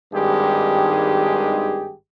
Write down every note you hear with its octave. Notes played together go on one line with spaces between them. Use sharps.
G#1 G2 D#3 G#3 G4 G#4